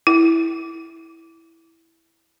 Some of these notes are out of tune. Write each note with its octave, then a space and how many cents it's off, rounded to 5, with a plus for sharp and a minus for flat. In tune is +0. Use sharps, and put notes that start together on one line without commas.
E4 +0